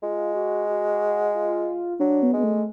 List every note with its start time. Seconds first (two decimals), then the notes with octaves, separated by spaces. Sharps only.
0.02 G#3 F4
0.35 F#4
0.69 F#4
1.35 F4
2.00 F#3 D4
2.23 B3
2.33 G#3 B3
2.44 A3